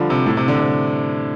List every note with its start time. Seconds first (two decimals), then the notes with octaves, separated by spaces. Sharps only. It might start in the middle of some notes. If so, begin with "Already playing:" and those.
Already playing: D3 F3 G3
0.10 C3
0.26 A2
0.37 C3
0.48 D3
0.59 C3